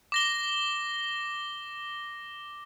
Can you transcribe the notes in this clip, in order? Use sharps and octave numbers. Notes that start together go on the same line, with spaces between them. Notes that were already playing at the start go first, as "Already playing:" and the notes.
D6 A#6 G7